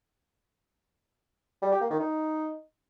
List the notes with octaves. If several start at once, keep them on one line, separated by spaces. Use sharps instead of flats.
G3
G4
A#3
D#3
D#4